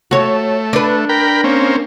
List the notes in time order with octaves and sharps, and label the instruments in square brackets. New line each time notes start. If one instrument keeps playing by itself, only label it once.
[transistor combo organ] A3 [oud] F#4 C#5
[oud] D4 B4
[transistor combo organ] A#4 G5 B5
A#3 C4 C#4